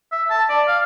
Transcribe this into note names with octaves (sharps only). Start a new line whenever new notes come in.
E5
A5
D5
F5